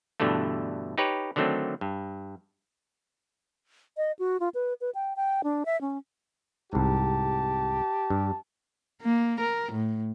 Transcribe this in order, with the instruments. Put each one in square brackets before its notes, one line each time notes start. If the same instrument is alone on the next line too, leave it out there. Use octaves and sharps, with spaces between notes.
[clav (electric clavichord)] G2 B2 D3 E3 A3
D#4 G4 B4 C#5
D3 D#3 F#3 A3 C4
G2
[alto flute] D#5
F#4
F4
B4
B4
G5
G5
D4
E5
C#4
[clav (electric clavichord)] C2 G#2 [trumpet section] G4 A5
[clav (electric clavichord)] G2
[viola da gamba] A#3
A#4
A2